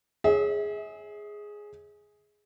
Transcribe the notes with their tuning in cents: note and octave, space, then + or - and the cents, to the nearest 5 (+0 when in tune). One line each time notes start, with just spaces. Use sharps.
G#4 +0 C#5 +0 E5 -40